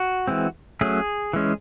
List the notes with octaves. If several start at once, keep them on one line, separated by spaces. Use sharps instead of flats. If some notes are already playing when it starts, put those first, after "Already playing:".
Already playing: F#4
E3 G#3 C4
F#3 A3 C#4 G#4
E3 G#3 C#4